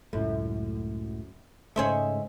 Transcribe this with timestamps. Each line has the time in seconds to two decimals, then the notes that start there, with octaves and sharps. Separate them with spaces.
0.13 C#2 F#2 A2 A3
1.76 G#2 C#3 G#3 A3 G#4 C5 C#5 E5